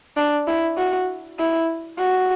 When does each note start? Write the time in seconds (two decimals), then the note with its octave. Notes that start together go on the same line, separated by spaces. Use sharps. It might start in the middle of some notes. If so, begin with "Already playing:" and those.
0.17 D4
0.47 E4
0.77 F#4
1.39 E4
1.99 F#4